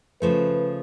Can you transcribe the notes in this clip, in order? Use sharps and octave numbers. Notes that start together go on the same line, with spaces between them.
C#3 F3 A3 B4